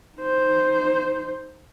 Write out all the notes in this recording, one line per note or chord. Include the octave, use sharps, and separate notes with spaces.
D#4 C5